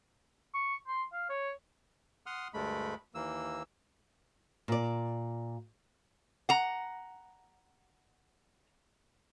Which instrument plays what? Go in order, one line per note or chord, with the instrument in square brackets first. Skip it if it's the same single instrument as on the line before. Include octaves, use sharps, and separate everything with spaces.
[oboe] C#6
C6
F5
C#5
[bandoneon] F#5 C6 D#6 F6
D2 G2 G#3 A3 B5
D#2 E3 A#3 E6
[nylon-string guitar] A#2 D5
[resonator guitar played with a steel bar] F#5 A#5